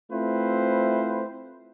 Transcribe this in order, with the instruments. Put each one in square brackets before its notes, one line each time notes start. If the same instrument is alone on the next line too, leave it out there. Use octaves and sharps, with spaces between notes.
[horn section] A3 C4 E4 F4 B4 C5